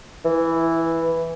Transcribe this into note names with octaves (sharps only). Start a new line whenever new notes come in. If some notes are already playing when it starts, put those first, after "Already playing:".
E3